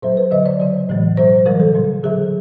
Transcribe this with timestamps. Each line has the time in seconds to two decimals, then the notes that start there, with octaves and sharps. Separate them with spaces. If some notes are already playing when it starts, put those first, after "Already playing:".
0.02 A#2 F#3 C5
0.17 B4
0.31 D3 F#3 D#5
0.46 D5
0.60 C#3 F#3 C#5
0.89 A2 E3 G#3
1.17 B2 F#3 C5
1.46 C#3 E3 G3 A#4
1.60 A4
1.75 A#2 G3
2.03 D3 F#3 G#4